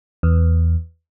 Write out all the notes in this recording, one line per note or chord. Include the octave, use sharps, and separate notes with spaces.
E2